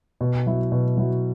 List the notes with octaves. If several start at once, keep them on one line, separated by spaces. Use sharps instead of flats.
B2
F#3 E4
B2
F#3 E4